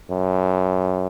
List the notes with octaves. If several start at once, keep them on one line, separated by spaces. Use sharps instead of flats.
F#2